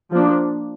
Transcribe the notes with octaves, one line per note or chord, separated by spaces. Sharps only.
F3 A#3 D4